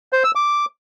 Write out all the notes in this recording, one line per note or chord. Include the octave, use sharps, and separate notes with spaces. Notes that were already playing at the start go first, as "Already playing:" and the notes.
C5
E6
D6